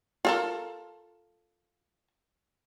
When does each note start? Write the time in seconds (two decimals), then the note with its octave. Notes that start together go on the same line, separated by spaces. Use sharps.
0.25 F4 A4 A#4